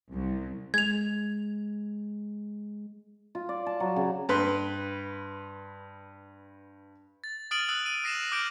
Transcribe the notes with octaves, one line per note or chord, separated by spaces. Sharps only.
C2
G#3 G#6 F7
F4
D5
A5
F#3
C#3
G2 B4 C6
A6
D#6 F6 A6 D7 D#7 F#7
D#6 E6 F#6 F#7
D#7
D#6 A#6 C7 D7 E7 F7
D6 F6 G6 D7